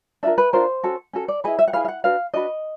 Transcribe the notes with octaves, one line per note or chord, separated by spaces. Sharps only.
D4 F4 A#4 E5
B4
D4 F4 A#4 C5
C#4 F#4 A4
C#4 F#4 A4
D5
E4 G#4 B4 D#5
E5
F#5
E4 G#4 B4 F5
F5
F#5
D4 F#4 B4 F5
D4 F#4 B4 D#5